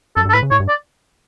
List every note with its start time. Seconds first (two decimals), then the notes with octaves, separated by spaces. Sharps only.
0.16 F#2 A4
0.25 G2
0.29 A4
0.34 A2 B4
0.43 C#3
0.51 A2 C#5
0.60 G2
0.69 D5